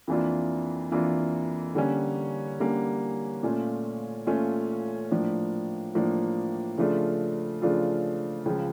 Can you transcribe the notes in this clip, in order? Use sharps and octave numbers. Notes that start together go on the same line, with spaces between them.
F2 E3 A#3 D4 F4
F2 E3 A#3 D4 F4
D3 G3 A#3 C#4
D3 G3 A#3 C#4
A#2 A3 C#4 F4
A#2 A3 C#4 F4
A2 F3 A#3 D4
A2 F3 A#3 D4
C#3 F3 A3 D4 F4
C#3 F3 A3 D4 F4
C#2 C#3 F3